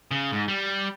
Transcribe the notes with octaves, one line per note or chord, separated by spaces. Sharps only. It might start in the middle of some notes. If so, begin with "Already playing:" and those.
C#3
G#2
G3